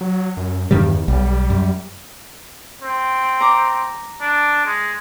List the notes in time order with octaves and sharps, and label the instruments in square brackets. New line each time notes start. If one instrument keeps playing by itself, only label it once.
[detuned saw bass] F#3
F#2
[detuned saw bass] E2 [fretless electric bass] G2 D#3 G3
[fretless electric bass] B1 [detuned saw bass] G3
[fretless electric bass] F#2
[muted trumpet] C4
[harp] A#5 D6
[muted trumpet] D4
G#3